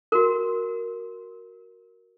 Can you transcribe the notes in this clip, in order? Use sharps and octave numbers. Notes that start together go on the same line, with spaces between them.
F#4 A#4